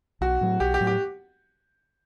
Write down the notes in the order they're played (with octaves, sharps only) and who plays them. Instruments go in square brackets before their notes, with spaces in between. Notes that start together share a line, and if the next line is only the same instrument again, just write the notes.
[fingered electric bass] B1 [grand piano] F#4
[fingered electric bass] A2 F#3
[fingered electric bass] B1 [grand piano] G4
[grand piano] G4
[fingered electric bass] A2 F#3
[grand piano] G4